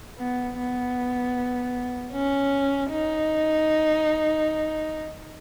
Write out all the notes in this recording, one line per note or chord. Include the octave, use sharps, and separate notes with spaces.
B3
B3
C#4
D#4